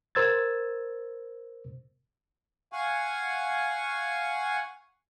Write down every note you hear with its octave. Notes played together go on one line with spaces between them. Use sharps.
A#4 C5 E6 G#6 A6
F5 F#5 G#5 C#6